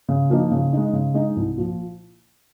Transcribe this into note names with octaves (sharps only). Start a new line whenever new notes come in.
C#3
F3 A#3 D#4
C#3
G#3 D#4
C#3
G#3 D#4
C2
A#2 F3